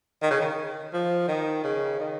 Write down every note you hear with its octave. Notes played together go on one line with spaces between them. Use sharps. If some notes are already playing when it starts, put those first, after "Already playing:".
D#3
C#3
D#3
F3
D#3
C#3
D#3